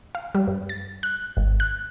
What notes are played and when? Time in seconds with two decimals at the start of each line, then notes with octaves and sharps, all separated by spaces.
0.15 F5
0.35 G3
0.48 G2
0.69 A6
1.03 F#6
1.37 G#1
1.60 F#6